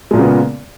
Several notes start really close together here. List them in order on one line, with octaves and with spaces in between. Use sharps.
G#3 A#2 A#3 C#3 B3